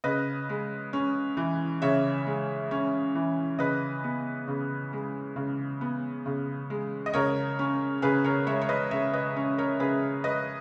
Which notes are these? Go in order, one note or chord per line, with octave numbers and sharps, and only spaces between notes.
C#3 B4 D#5
G#3
C#4
E3
C#3 C#5 E5
G#3
C#4
E3
C#3 B4 D#5
B3
C#3
G#3
C#3
B3
C#3
G#3
D#5
C#3 A#4 C#5
C#4
C#3 G#4 B4
A#4 C#5
G#3 C#5 E5
C#5
B4 D#5
C#3 C#5 E5
B4 D#5
C#4
A#4 C#5
C#3 G#4 B4
G#3 B4 D#5